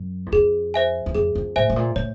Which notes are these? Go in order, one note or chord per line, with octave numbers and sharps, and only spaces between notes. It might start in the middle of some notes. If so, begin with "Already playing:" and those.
Already playing: F#2
E2
F2 G#4
C5 E5 G#5
E2
F2 G#4
F2
A2 C5 E5 G#5
A2
A#2
A2 C#5